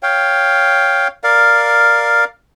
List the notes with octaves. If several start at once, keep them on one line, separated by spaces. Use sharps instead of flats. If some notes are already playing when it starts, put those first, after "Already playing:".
C#5 F5 G5
A#4 D5 F5